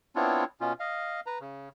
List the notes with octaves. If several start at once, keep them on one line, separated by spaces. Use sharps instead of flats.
B3 C4 D4 E4 F4 C#5
B2 C#4 F4
D#5 F5
B4 A#5
C#3